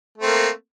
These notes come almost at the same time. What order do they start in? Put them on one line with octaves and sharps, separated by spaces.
A3 C4 A#3